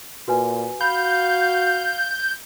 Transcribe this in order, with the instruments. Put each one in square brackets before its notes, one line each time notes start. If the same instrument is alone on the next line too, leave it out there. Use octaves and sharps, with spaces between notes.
[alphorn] A#2 [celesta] F#4 B4 G#5
[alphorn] F#4 [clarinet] F5 [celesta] B5 [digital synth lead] G6